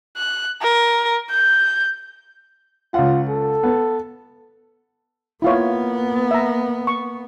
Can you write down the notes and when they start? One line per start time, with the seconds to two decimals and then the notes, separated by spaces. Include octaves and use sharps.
0.17 F#6
0.62 A#4
1.31 G6
2.94 C#2 F4 F#5
3.29 A4
3.63 B3
5.42 A#3 B3 E4 F4 C#5
6.31 E5 A#5
6.87 C#6